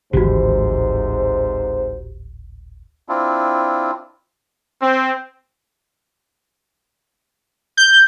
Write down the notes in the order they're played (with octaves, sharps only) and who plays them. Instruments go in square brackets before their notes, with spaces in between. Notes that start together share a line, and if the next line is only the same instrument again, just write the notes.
[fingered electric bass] D1 G#1 E3 [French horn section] G#2 C3 C5 [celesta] F#4 G4
[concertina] C4 D4 E4 F4
[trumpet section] C4
[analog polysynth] G6